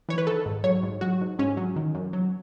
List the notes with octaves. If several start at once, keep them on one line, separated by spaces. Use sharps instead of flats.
E3 C#5
B4
D#3 A4
G#2
F#3 C#5
G#2
F#3 F#4
G#2
G#2 C#4
F#3
D#3
F#2
F#3